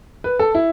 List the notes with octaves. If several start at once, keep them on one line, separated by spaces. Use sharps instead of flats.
B4
A4
E4